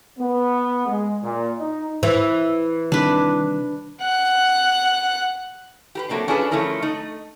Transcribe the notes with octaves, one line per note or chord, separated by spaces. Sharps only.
B3
G#3
A#2
D#4
E3
C3 D#3 G3 D4 B4
F#5 F#6
G4 A#4 B4
F#3 A3 A#3 C4 D4
C#4 D4 F4 G#4 A4 B4
F3 G3 A3 C#4 E4 A#4
A3 D#4